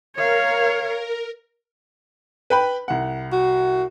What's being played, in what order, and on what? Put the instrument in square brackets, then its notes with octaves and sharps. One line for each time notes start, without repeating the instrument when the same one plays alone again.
[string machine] A#4 [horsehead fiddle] C#5 F5
[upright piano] B4 G5 B5
C2 F#5
[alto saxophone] F#4